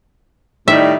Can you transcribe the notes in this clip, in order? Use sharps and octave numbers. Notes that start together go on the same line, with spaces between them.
A2 D#3 G3 E5